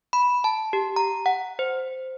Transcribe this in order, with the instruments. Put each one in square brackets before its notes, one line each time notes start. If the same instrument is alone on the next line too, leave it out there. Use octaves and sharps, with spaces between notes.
[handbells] B5
A5
G4
A#5
F#5
C5